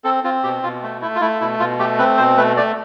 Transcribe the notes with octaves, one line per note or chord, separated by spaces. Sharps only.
C4 A4
C4 F4
B2 G4
B2 F4
A3
A3 E4
F4
A3 E4
B2 E4
B2 F4
A3 G4
C4 B4
B2 C5
A3 B4
A3 D5